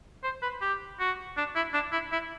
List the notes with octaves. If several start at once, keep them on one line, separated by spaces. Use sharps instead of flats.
C5
B4
G4
F#4
D4
E4
D4
E4
E4